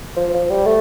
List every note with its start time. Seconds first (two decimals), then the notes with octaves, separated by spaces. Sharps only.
0.16 F3
0.34 F3
0.50 G3
0.66 A3